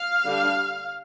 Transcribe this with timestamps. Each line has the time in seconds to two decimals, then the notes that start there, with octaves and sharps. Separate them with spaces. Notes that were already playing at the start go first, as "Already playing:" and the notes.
Already playing: F5
0.25 D3 G3 D4